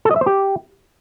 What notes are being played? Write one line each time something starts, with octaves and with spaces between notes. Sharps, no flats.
A4
D#5
E5
C5
G4